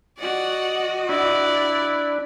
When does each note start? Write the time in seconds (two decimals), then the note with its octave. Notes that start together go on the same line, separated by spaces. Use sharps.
0.19 F#4 D5 D#5 F#5
1.09 D4 E4 D5